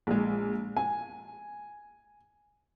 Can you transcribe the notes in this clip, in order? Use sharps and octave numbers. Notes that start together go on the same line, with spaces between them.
A#1 G#3
G#5